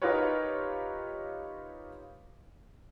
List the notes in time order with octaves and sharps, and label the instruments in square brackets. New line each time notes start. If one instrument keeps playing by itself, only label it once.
[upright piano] D#4 F4 G4 A#4 B4 C#5